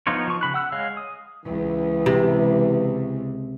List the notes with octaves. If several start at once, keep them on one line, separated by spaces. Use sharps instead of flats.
F3 B3 D#4 F4 C#5
F3 C#6
C#3 B5 F#6
F#5 E6 F#6
G#3 C#5 F5
D#6
C#2 E3
C3